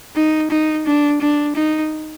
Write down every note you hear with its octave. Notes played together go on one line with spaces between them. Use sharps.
D#4
D#4
D4
D4
D#4